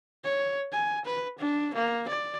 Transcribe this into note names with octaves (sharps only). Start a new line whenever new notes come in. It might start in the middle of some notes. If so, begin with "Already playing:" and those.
C#5
G#5
B4
D4
A#3
D5